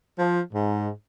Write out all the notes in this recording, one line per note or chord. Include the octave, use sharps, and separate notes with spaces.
F3
G#2